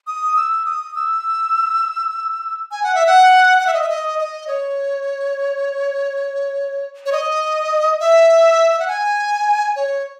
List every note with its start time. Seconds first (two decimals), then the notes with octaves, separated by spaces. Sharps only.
0.07 D#6
0.37 E6
0.66 D#6
0.95 E6
2.71 G#5
2.83 F#5
2.95 E5
3.06 F#5
3.60 F#5
3.67 E5
3.74 D#5
3.82 E5
3.89 D#5
4.19 D#5
4.47 C#5
7.06 C#5
7.12 D#5
8.00 E5
8.71 E5
8.79 F#5
8.88 G#5
9.76 C#5